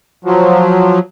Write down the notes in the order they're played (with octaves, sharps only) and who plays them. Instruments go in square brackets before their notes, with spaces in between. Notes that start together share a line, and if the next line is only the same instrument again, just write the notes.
[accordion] F3 F#3